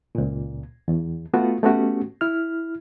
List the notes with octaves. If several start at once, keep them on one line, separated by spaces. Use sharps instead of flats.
C#2 A#2
E2
A3 B3 F4 F#4
A3 B3 C#4 F#4 G4
E4 F6